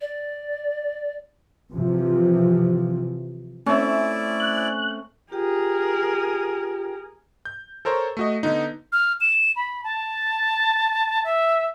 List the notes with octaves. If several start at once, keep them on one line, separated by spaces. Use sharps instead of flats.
D5
C3 E3 F3
A3 C4 C#4 E4 D5 E5
F#6
F4 G4 G#4 A#4 G5
G6
A4 A#4 C5 C#5 A#5
A3 F#4 D#5
D3 B3 D#4
F6
E7
B5
A5
E5